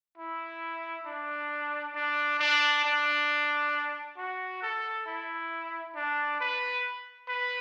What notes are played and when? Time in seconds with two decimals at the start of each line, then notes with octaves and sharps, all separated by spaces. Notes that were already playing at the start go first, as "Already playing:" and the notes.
0.18 E4
1.06 D4
1.95 D4
2.40 D4
2.85 D4
4.17 F#4
4.62 A4
5.06 E4
5.96 D4
6.40 B4
7.28 B4